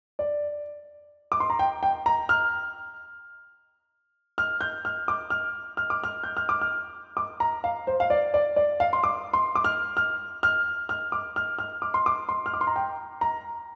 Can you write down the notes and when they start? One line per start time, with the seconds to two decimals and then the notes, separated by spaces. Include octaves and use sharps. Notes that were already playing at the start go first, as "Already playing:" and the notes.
0.19 D5
1.32 D6
1.40 C6
1.50 A#5
1.59 G5
1.83 G5
2.06 A#5
2.29 F6
4.38 F6
4.61 G6
4.85 F6
5.08 D6
5.30 F6
5.77 F6
5.90 D6
6.04 F6
6.23 G6
6.37 F6
6.49 D6
6.61 F6
7.17 D6
7.40 A#5
7.64 F5
7.87 C5
8.00 F5
8.10 D5
8.34 D5
8.56 D5
8.80 F5
8.93 C6
9.04 D6
9.33 C6
9.55 D6
9.64 F6
9.97 F6
10.43 F6
10.89 F6
11.12 D6
11.36 F6
11.59 F6
11.82 D6
11.94 C6
12.06 D6
12.29 C6
12.46 F6
12.54 D6
12.61 C6
12.67 A#5
12.76 G5
13.21 A#5